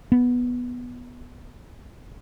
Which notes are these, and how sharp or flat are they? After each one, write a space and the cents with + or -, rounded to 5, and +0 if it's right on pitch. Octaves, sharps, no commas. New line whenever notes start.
B3 -5